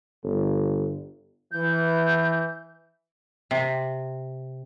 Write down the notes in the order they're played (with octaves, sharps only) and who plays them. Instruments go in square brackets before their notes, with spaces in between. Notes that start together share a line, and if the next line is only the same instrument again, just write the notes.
[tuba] G1
[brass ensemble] E3 [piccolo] G6
[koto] C3